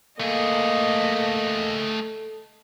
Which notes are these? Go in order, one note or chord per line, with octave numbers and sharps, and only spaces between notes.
A3 A#3 G#4 A4 D#5